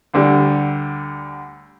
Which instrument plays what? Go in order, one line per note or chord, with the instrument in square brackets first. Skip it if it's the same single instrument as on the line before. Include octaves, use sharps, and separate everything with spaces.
[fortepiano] D2 D3 G3